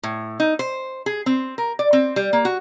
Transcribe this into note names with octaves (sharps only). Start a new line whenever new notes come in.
A2
D#4
C5
G#4
C4
A#4
D5
C4
G3
A#3
F#4